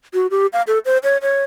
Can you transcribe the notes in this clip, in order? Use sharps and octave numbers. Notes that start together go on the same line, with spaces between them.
F#4
G4
F5
A4
C5
C#5
C#5